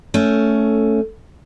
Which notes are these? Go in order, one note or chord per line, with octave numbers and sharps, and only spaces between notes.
A3 C#4